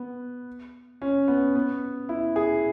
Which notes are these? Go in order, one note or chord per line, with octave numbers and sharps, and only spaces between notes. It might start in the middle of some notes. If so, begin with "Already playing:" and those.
Already playing: B3
C#4
B3
B3
E4
G#4